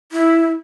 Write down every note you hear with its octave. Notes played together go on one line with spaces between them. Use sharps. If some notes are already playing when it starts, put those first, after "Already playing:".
E4